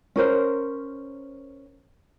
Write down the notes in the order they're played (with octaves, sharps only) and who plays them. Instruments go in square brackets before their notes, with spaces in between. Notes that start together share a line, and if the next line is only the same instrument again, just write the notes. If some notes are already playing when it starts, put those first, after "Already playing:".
[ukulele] C#4 A#4 C5